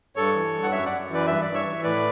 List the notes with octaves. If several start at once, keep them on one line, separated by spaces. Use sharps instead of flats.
G2 A4 C#5
E3
G2
F#5
F#2 C#5 E5
D5 F#5
F#2
E3 B4 D5
G2 E5
D5
G2
C#5 E5
E3
A2 B4 D5